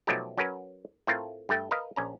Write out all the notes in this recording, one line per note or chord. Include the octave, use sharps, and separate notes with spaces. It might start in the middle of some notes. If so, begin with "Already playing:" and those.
B2 F3 F#3 A3 D#4 G4
F#3 C#4 F#4 A#4 B4
A2 A3 C4 F4 A#4
G2 A3 G5
A#4 B4 D#5 F5
A#1 C#4 A#5